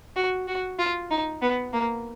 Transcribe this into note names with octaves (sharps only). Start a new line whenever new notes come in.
F#4
F#4
F4
D#4
B3
A#3